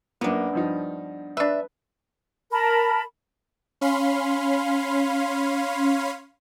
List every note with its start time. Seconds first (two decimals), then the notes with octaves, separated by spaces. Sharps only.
0.21 F#2 A#3 B3 D4
0.53 G2 F3 D#4
1.37 D4 B4 E5
2.51 A#4 A5 B5
3.81 C#4 F5 B5 C6